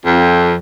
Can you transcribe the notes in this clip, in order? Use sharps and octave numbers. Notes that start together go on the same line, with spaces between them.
F2